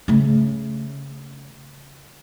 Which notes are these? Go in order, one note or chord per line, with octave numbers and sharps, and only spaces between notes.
C#3 A3